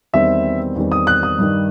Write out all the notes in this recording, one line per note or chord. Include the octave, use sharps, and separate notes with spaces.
E2 D#3 G3 C4 E5
E2 D#3 G3 C4
D#6
F#6
D#6
G2 D#3 G3